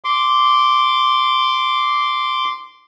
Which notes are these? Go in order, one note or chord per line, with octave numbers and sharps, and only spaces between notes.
C6 D6